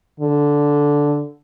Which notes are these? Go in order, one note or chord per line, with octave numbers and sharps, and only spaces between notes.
D3